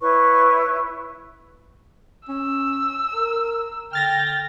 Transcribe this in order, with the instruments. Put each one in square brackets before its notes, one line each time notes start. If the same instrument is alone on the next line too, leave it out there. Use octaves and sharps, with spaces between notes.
[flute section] E4 B4 C#5 C#6
[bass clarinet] C#4 [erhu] E6
[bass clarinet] A#4
[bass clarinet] D3 [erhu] G5 [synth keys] F6 A6 A#6